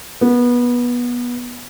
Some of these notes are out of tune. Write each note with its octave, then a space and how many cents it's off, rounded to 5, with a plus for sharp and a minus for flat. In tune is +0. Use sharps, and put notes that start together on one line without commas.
B3 -20